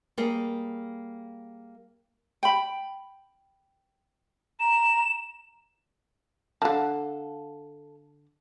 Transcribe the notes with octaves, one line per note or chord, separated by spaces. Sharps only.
G3 A#3 G#4
G5 B5
A#5 E7
D3 D#3 A4 F5 A5